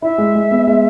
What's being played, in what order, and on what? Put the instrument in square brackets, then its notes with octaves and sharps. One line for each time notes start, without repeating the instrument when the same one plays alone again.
[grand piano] E4 [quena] E5
[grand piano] G#3
G#3
B3
G#3